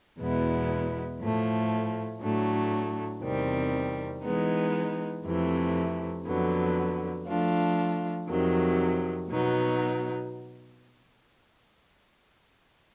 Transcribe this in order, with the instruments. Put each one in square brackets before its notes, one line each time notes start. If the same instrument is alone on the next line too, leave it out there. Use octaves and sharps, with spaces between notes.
[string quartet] E2 B2 G#3 B3 E4
A2 F3 A3
A2 F#3 A3 D4
E2 C3 D#3 G3 C4
E3 G#3 B3 D#4
F2 C3 E3 A3
F2 D3 F#3 B3
F3 A3 D4 F4
F2 C3 D#3 F#3
B2 F#3 B3 D#4